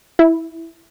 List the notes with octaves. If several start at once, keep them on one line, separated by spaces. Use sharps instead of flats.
E4